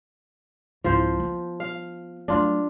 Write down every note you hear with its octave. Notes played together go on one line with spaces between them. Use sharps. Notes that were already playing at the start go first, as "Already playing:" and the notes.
C2 G#2 F3 C5
B3
F5
F#3 A3 D4 F4